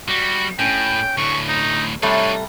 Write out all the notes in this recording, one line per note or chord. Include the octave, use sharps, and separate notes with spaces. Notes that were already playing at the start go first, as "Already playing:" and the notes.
G3 F#4
A2 C#4 G5
D2 A2 C#6
D#4
C3 G3 A3 D4 D#4 C#5